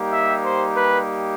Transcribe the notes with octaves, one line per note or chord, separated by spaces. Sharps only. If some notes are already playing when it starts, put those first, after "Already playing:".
Already playing: G3 A#3 D#4 G4
E5
C5
B4